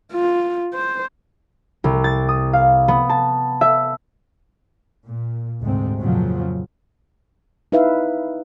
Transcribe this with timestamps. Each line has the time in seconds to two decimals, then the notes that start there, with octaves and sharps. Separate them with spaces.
0.13 F4
0.74 C5
1.84 C2
2.04 A6
2.29 D#6
2.53 F5
2.88 B3
3.09 A5
3.61 E5
5.06 A#2
5.62 D2 G#2 C3 C4
6.01 F2 A#2 C#3 F3 F#3
7.72 D#4 E4 B4 E5 F5